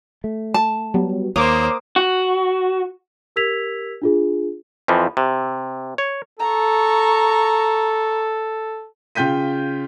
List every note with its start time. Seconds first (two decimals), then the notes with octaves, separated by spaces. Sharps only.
0.24 A3
0.54 A5
0.94 F#3 G3 B3
1.36 D#2 A#3 C5 C#5 D6 D#6
1.96 F#4
3.36 G4 A#4 E6 G#6 B6 F7
4.02 D4 F4 G#4
4.88 F2 E3 F3
5.17 C3
5.98 C#5
6.39 A4 A#5 C#6
9.15 C#3 F4 G5 G6 B6 D#7